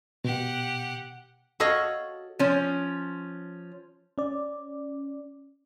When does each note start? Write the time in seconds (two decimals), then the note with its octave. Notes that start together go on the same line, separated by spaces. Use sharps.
0.24 B2 G4 F#5
1.60 F#4 A4 C#5 D#5 F5
2.39 F3 C#4
4.18 C#4 D5